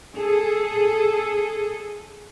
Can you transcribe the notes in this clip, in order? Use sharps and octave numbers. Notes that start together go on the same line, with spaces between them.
G#4 A4